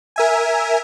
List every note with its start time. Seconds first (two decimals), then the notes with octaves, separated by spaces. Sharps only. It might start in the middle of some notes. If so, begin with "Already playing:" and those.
0.16 A#4 E5 G#5